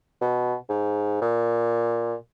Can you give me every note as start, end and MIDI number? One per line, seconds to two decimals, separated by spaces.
0.21 0.55 47
0.69 1.20 44
1.21 2.15 46